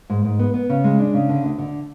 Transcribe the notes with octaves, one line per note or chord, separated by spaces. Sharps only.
G#2
G#2
B3
B3
C#3
G#3
D4
C#3
D3
D2
D3